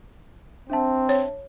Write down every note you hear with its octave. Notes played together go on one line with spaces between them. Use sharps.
C4 D4 E5 A5
C#5